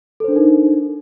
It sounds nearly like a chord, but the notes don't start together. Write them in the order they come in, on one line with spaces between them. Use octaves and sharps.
A4 C5 D4 A#4 D#4